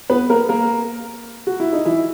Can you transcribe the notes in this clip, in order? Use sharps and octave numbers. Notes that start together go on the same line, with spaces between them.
B3 B4
A#3 A#4
A#3 A#4
F#4
E4
D#4
E3 E4